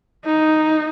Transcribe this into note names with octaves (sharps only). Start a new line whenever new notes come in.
D#4